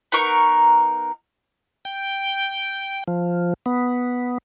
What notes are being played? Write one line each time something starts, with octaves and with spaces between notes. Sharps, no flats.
B3 D#4 A#4 C#6
G5
F3
B3